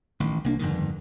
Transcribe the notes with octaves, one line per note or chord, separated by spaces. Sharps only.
A1 D#3
C2 A#3 D4
G1 F2 G#2 D#3